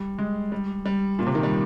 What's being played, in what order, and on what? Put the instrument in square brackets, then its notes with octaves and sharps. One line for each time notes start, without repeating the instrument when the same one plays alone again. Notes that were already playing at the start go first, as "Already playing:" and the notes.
Already playing: [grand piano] G3
G#3
G3
G3
A#2
C3
D#3
G3